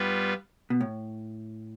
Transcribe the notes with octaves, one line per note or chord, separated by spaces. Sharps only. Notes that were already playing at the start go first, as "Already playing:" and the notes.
Already playing: G2 G3 B3 F4 B4
B2
A2